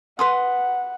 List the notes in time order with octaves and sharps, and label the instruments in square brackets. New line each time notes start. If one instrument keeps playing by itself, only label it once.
[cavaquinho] B4 C6 D#6 [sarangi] F#5